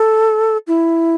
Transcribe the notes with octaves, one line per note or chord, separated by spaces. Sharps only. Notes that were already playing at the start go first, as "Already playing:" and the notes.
Already playing: A4
E4